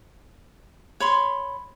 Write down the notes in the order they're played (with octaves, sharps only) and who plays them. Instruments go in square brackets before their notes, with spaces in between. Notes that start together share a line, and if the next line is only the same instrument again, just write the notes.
[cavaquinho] C#5 B5 C6